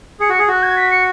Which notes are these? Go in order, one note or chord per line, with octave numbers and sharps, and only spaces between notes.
G#4 C#7
F#4
G#4
F#4 F#6
G#6
B6
C#7